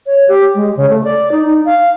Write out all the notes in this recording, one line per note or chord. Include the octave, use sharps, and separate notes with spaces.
C#5
G4
G#3
C#3
A3
D5
D#4
D#4
F5